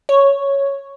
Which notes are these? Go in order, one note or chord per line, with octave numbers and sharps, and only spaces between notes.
C#5